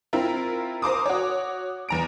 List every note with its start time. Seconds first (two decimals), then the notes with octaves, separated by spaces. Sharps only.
0.13 C4 E4 F4 A#4
0.82 A#4 C5 D6 D#6
1.06 F#4 C#5
1.89 E2 A#5 D7